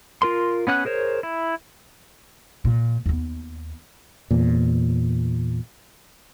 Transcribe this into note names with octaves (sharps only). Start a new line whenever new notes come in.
F4 A#4 C6
B3 C#4 F#5 F#6
G#4 A#4 C5 C#5
E4
A#2 F3
D#2 B3
E2 A#2